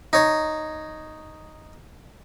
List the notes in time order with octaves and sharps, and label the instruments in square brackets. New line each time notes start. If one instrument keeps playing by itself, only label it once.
[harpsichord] D#4 C#5